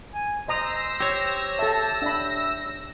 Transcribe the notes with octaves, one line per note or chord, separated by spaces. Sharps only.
G#5
C5 D#5 A#5 D#6 E6 A#6
G4 C#5
A4 E5 A5
D4 E5 B5